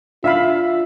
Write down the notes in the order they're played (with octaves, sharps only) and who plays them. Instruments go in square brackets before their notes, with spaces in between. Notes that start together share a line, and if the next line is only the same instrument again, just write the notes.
[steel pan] D4 F5 B5 [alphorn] F4 [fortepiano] E5